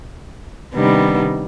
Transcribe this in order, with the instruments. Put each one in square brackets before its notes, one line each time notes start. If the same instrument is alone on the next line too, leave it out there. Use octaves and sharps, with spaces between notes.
[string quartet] C3 D#3 G3 B3 D4